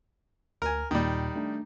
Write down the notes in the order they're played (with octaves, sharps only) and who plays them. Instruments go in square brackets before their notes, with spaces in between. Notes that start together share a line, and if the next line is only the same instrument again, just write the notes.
[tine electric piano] D2 [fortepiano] A#4 G#5
[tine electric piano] D#2 A#2 [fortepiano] D#3 G3
[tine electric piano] A3 D4